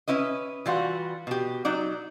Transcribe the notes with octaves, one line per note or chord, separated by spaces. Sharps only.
C#4 E4 B4 D#5
E3 G3 F4 F#4
B2 G4
F#3 D#4 D5